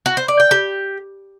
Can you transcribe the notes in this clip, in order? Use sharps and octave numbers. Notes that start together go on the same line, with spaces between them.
F#4
C5
D5
G5
G4